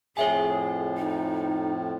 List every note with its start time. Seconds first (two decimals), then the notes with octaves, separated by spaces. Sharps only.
0.17 F2 A2 G#4 C#5 E5 G#5
0.98 D#4